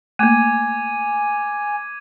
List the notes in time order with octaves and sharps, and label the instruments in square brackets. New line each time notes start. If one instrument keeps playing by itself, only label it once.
[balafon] A3 A#3 [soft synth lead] G#5 [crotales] D6 G#6 D#7